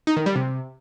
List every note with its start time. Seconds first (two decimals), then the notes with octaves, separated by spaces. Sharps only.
0.07 D#4
0.17 D#3
0.26 G3
0.36 C3